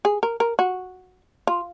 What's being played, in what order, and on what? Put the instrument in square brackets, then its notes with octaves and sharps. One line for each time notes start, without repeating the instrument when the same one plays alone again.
[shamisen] G#4
A#4
A#4
F#4
F4